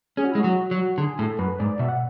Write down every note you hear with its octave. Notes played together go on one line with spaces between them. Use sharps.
C#4 G#4
F#4
E4
G#3
F#3 F#4
F#3
D3 G#4
A2 A4
F#2 B4
G#2 D5
B2 E5
F#5